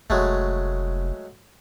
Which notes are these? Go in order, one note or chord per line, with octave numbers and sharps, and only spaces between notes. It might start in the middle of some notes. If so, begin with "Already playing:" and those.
F1 F#3 G#3 A3